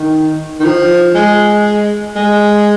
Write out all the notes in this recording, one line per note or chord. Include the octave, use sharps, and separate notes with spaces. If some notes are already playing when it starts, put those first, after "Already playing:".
Already playing: D#3
D#3
F3
G#3
G#3